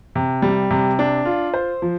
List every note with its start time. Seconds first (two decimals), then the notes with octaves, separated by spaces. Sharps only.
0.16 C3
0.42 G3
0.71 C3
0.99 D4
1.25 F4
1.54 C5
1.82 F3